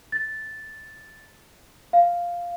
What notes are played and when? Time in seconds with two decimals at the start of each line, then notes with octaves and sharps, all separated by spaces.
0.12 A6
1.93 F5